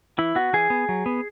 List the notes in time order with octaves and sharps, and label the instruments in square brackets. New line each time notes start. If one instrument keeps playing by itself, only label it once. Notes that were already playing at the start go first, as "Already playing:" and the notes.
[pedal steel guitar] E3 E4
B3 F#4
E3 G#4
B3
F#3
B3